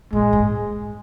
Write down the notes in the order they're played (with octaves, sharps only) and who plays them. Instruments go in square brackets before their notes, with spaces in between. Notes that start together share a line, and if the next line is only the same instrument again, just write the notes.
[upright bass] A#2 [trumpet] G#3
[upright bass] G#2